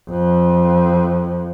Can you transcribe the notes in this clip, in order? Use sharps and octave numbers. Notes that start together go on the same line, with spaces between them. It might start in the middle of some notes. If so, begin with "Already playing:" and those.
F2